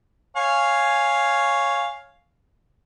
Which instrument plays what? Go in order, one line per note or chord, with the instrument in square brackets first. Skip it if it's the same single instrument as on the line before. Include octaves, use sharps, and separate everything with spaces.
[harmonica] C#5 F5 G#5